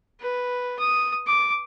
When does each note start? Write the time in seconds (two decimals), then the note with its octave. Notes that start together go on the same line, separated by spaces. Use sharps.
0.20 B4
0.79 D#6
1.26 D6